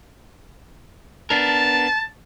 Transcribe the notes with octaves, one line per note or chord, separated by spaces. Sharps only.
B3 D4 A#4 A5